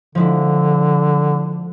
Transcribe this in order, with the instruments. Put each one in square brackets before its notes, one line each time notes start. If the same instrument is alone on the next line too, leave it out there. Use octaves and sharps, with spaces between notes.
[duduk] D3 [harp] F3 G#3 E4